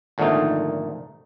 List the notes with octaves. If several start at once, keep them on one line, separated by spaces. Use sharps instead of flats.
G#1 A#2 D3 F3 A3 D#4